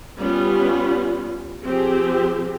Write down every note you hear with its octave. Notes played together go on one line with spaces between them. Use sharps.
G3 B3 C#4 F4
F3 C4 G4 G#4